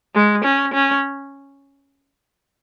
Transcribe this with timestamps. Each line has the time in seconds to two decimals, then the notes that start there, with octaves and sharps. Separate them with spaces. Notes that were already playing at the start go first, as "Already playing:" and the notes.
0.15 G#3
0.44 C#4
0.74 C#4